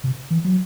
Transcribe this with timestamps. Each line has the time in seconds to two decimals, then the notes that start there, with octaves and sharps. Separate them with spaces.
0.04 C3
0.30 E3
0.44 F#3